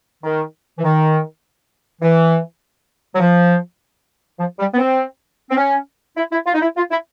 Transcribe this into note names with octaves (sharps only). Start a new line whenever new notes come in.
D#3
E3
D#3
E3
F#3
F3
F3
G3
B3
C4
C4
C#4
E4
E4
F4
D#4
E4
F4
E4